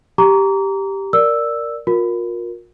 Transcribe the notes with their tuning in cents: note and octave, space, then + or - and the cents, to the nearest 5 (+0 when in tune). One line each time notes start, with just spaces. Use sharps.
G4 +0 A#5 +0 D6 -40
A#4 +0 D5 +0 E6 +0
F4 +40 A#4 +10